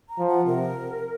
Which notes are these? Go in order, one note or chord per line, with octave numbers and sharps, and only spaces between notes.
A#5
F3
F#5
C3 A#4